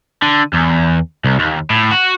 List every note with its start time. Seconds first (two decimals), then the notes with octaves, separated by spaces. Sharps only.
0.22 D3
0.53 E2
1.24 C2
1.39 D#2
1.70 A2
1.91 F#4